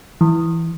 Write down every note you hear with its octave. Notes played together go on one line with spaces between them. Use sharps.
E3